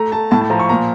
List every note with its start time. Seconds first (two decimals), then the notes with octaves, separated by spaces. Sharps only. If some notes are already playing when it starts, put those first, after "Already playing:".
Already playing: A3 A#5
0.12 A3 A5
0.31 A2 A5
0.41 A5
0.50 F3 A#5
0.59 C#6
0.69 A#2 A#5